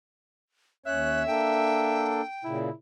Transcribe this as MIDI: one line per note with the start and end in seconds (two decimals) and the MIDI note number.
0.86 1.24 39
0.86 1.24 61
0.86 1.24 73
0.86 2.12 76
0.86 1.23 90
1.27 2.21 58
1.27 2.21 62
1.27 2.21 69
1.27 2.58 79
2.44 2.70 46
2.44 2.70 49
2.44 2.73 64